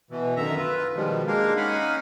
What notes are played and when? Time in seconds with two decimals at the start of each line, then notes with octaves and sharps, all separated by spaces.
0.11 B2 E3
0.36 F#2 D3 D#3 E5 A#5
0.56 F4 B4
0.96 B2 D#3 F3 G3 G#3
1.27 G#3 A#3 D4 A#4 F5
1.57 C#4 D#4 F5 F#5 G#5 B5